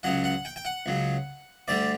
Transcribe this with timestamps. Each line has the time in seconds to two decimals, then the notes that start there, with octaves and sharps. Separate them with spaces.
0.03 C#2 C#3 F#3 F#5
0.24 F#5
0.45 G5
0.56 G5
0.65 F#5
0.86 C#2 C#3 F#3
1.68 D2 D3 G3 D5